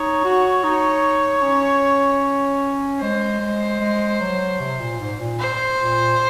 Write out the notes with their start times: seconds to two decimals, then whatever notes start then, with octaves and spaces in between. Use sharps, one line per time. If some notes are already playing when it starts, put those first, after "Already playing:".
Already playing: D#4 C#5
0.24 F#4
0.64 D#4
1.42 C#4
3.01 G#3 C5
3.40 G#3
3.80 G#3
4.21 F#3
4.60 C3
4.80 A#2
5.00 G#2
5.20 A#2
5.39 C5
5.78 A#2